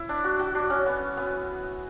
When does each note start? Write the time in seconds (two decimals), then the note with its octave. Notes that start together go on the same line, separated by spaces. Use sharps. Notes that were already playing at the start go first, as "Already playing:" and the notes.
Already playing: E4
0.09 D4
0.24 F#4
0.39 F#4
0.55 D4
0.70 C#4
0.86 B3
1.17 B3